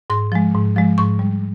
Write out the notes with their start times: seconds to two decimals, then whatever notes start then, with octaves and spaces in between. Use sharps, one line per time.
0.10 G#2 C6
0.32 F3 G#3
0.54 G#2
0.76 F3 G#3
0.98 G#2 C#6
1.19 G3